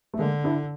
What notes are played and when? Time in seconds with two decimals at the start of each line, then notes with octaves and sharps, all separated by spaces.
0.14 A3
0.18 D3 G#3 A#3
0.44 D4 E4